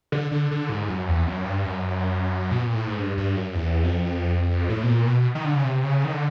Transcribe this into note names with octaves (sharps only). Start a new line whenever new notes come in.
D3
D3
D3
G#2
F#2
E2
F#2
G2
F#2
B2
A#2
A2
G#2
G2
G2
F#2
E2
F2
A2
B2
A#2
B2
D#3
D3
C#3
C3
C#3
D#3
D3